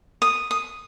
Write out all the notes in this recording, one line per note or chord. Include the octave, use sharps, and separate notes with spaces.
D#6
D#6